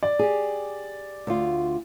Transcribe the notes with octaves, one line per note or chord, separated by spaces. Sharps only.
D5
G4 G#4
D2 F4